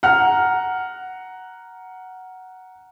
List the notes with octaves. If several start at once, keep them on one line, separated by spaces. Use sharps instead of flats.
F#5 A#5 F6